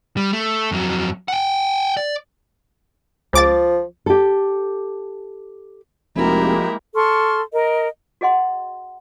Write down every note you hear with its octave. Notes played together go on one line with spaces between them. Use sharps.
G3
A3
F2 F#3
F#5 G5
D5
C#2 F3 D6 A6
G4 A4
F1 F3 G#3 A#3 E4 F#4 G4 A#4
A4 C6 C#6 F6
A#4 D#5
F#4 G#4 D#5 F#5 C6